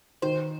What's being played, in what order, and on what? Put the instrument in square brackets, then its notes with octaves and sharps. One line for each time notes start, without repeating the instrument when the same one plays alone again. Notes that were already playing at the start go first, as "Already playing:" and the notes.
[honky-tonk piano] D#3 [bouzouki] C5